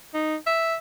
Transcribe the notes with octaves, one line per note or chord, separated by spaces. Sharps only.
D#4
E5